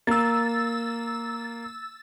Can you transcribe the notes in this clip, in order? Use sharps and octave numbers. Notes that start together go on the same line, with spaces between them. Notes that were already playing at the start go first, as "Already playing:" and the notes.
A#3 E6 A6